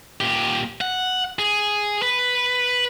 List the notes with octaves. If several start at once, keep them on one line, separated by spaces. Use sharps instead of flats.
A#2 G4
F#5
G#4
B4